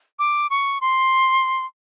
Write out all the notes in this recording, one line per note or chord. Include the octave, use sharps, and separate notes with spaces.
D6
C#6
C6